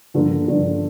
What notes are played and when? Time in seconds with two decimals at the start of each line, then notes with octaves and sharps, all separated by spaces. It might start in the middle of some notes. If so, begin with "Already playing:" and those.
0.14 G2 D3 F3 A#3 D4
0.47 G2 D3 F3 A#3 D4